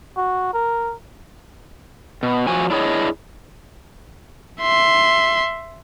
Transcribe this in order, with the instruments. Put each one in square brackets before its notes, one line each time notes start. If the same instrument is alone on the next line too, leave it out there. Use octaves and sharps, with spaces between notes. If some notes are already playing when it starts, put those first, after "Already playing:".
[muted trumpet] F#4
A#4
[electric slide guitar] B2
F3 F#4 G#5
D4 E4 G#4 C#5 D#5
[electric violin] E5 C6